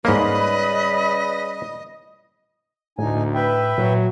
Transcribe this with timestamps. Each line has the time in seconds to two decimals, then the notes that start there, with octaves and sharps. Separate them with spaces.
0.05 G#2 C#3 G3 A#3 B4 D#5 B5
2.98 D2 A2 D#4 G#5
3.35 B4 E5 G5
3.78 A#2 F#3